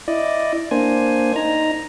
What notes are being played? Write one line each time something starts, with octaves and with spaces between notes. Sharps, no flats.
E4 D5 D#5
A#3 D4 C5 G#5
D#4 A#5